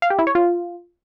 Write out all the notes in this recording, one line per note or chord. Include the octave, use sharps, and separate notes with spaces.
F5
G4
E4
C#5
F4